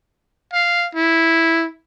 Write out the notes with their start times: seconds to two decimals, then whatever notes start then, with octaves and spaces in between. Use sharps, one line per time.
0.53 F5
0.95 E4